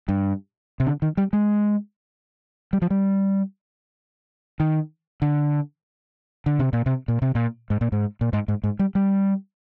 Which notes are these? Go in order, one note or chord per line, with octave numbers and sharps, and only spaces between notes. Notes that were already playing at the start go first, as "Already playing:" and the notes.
G2
C3
D3
D#3
G3
G#3
G3
F3
G3
D#3
D3
D3
C3
A#2
C3
A#2
C3
A#2
G#2
A#2
G#2
A#2
G#2
G#2
G#2
G3
G3